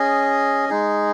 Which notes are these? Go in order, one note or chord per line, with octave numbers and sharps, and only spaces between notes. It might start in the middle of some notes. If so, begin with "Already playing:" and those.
Already playing: C#4 G#4 D#5
G#3 D#4 G#4